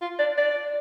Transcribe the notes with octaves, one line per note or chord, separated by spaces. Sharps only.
F4
D5
D5